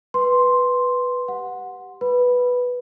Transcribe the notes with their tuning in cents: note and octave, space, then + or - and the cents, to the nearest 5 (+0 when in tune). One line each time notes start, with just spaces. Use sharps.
B4 +0 C6 +0
G4 -5 F#5 -15
B4 +0 B5 +0